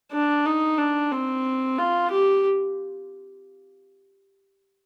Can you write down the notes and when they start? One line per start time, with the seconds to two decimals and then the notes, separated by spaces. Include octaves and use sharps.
0.12 D4
0.46 D#4
0.78 D4
1.11 C4
1.78 F4
2.11 G4